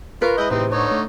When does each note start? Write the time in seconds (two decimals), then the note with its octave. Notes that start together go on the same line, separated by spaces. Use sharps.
0.22 F4 A#4 B4 B5 C#6
0.38 G#3 E4 D#5 B5 G6
0.50 E2 A2 C3 C4 D#4 C5
0.72 D3 D#4 C#5
0.91 A3